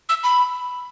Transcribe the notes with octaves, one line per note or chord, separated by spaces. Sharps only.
E6
B5